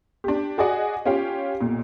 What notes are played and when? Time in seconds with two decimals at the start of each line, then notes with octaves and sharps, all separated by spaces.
0.24 D4 G4
0.58 F#4 G#4 D5 D#5 F#5
1.05 C#4 F4 G4 F5 G5
1.60 B1 A#2